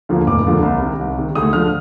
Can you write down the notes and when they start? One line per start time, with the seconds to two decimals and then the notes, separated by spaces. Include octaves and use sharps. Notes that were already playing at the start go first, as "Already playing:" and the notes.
0.09 D#2 D3 F3 A#3
0.27 F1 D6
0.45 D#2 D3 F3 A#3
0.63 C2
0.81 C3 D#3
0.99 C2
1.18 C3 D#3
1.35 D2 D#6
1.53 D3 F3 F6